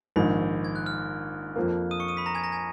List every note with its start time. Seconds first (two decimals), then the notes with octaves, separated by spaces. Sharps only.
0.16 A#1 G#2 D#3 B5
0.65 G#6
0.76 F#6
0.86 F6
1.56 F2 F3 A#3
1.91 D#6 D#7
2.00 C#6 C#7
2.08 D#6 D#7
2.17 B5 B6
2.26 A#5 A#6
2.35 G#5 G#6
2.43 A#5 A#6
2.52 G#5 G#6